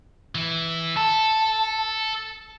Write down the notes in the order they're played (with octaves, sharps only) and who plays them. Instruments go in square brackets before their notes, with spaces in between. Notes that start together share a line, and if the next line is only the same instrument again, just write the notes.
[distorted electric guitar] E3 E4
[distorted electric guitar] A4 [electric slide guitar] A5